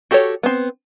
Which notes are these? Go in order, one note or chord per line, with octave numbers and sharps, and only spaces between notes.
F#4 G4 A4 A#4 C#5
B3 C4